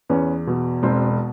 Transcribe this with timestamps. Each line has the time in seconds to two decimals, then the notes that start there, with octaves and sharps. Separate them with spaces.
0.09 E2 B3 C#4
0.47 B2
0.83 E1 C4